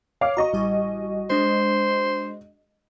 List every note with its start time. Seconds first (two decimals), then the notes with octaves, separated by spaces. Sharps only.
0.21 C#5 F5 D6
0.37 F#4 D#5 A#5 C#6
0.53 A1 G3 G#5
1.30 G#3 D4 C5